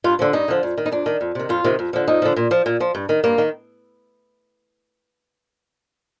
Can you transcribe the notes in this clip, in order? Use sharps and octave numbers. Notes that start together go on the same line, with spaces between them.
G2 F4
D3 F3
G2 D#4
D3 F3
F2
D#3
D#4
F2 D4
D#3
F2
C3 D#3
F2 F4
C3 D#3
F2
D3 F3
F2 D#4
D3 F3
A#2
F3
A#2
F3
G2
D#3
G2 A#3
D#3